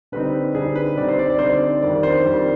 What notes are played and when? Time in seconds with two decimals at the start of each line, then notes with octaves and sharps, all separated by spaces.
0.12 D3 G3 C4 D#4 B4
0.55 D3 G3 C4 D#4 G#4
0.76 B4
0.97 D3 G3 C4 D#4 D5
1.09 C5
1.19 D5
1.30 D5
1.39 D3 G3 C4 D#4 C5
1.50 D5
1.82 F2 D#3 G3 D4 D5
2.03 C5
2.25 F2 D#3 G3 D4